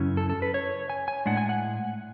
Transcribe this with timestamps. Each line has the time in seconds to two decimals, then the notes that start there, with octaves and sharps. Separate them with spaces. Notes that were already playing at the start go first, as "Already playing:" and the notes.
Already playing: F#2 C#3 F#3 C#4 E4
0.17 A4
0.30 A4
0.42 B4
0.54 C#5
0.90 G#5
1.08 G#5
1.26 A2 G#3 D4 F#5
1.37 G#5
1.49 F#5